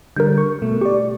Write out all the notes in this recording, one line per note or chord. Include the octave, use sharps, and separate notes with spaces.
D3 G3 A#4 G6
C#6
B2 A3
G4 D5 C#6